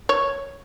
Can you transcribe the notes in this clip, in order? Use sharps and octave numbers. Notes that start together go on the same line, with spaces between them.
C#5